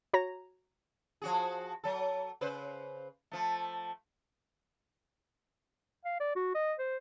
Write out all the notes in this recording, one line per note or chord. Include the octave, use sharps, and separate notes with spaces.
F#4 C#5 A#5 A#6
F3 F#4 G#4
F#3 A4
C#3 B4 C5
F3 A3
F5
D5
F#4
D#5
C5